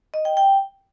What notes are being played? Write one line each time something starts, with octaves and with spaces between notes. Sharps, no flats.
D#5
G5
G5